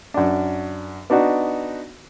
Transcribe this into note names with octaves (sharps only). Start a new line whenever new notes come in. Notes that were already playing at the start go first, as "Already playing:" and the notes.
F#2 D4
B3 D4 D#4 F#4